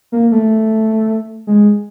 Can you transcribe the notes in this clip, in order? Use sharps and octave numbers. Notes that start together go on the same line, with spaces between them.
A#3
A3
G#3